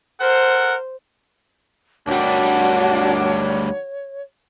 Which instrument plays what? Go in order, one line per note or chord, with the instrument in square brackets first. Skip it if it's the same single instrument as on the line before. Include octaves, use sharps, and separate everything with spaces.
[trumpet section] A4 A#4 F#5 [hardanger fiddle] C5
[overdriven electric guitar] D2 G3 [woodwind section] D#3 F#3 D4 [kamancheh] F#4 [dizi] C#5